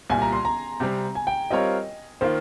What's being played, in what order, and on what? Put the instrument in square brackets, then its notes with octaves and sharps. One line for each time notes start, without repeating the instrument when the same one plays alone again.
[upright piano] C2 A#2 G3 [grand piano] G#5
[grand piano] A#5
C6
A#5
[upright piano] C3 G3 C4
[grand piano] G#5
G5
[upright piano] G3 C4 F4 A#4 C#5 [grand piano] D#5
[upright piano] D#3 A#3 F4 [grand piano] C5